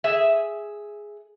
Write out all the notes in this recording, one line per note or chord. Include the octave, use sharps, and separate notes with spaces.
G#4 E5